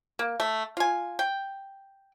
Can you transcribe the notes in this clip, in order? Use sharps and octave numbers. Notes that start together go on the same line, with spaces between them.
A#3
A3
F4 G#5
G5